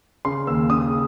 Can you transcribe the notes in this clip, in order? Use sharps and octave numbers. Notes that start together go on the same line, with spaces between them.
C#3 C6
D#2 E6
C#3 D#6